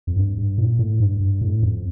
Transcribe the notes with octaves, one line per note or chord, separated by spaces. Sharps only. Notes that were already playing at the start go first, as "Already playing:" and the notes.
F2
G2
G2
A#2
A2
G2
G2
A2
F2